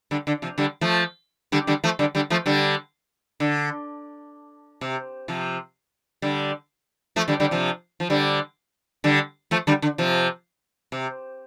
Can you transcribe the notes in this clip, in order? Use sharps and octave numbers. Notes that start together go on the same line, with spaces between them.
D3 G3
D3
C3 F3
D3 G3
F3 A3
D3 G3
D3 G3
F3 A3
D3 G3
D3 G3
F3 A3
D3 G3
D3
C3
C3 F3
D3 G3
F3 A3
D3 G3
D3 G3
C3 F3
F3
D3 G3
D3 G3
F3 A3
D3 G3
D3
C3 F3
C3